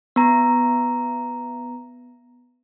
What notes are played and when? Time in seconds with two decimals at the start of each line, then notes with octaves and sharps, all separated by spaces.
0.16 B3 A#5